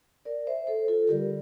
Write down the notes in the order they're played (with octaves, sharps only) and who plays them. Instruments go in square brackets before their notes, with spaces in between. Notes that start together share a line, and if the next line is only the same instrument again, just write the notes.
[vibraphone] A#4 D5
C5 E5
A4 C5
F4 A4
[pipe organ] D3 G3 [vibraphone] G4 A#4